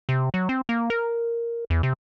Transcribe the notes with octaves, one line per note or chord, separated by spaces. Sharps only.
C3
F#3
C4
A#3
A#4
E2
C3